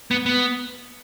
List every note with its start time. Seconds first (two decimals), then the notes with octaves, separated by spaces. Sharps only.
0.11 B3
0.26 B3